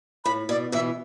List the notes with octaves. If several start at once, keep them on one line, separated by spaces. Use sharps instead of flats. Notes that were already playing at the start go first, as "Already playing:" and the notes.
A2 B5
B2 D5
B2 E3 E5